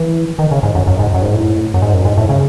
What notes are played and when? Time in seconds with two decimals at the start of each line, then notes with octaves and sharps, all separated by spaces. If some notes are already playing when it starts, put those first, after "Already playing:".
Already playing: E3
0.39 D#3
0.51 C#3
0.63 G#2
0.75 F#2
0.87 F#2
0.99 G#2
1.14 F#2
1.23 G#2
1.34 A2
1.74 F#2
1.82 G#2
1.93 F#2
2.05 G#2
2.17 A2
2.29 C#3